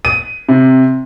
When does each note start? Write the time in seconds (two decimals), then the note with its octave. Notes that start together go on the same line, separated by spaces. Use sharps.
0.05 D#7
0.49 C3